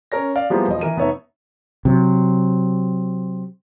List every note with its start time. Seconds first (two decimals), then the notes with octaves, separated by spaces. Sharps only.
0.12 C#4 A#4 C#5 A#6
0.35 D5 F5
0.50 F3 G3 G#3 A#3 B3 E4
0.67 E1 F3 D#5
0.81 E3 A#4 D#7
0.96 F1 B3 D#4 C#5 E5
1.85 C3 F#3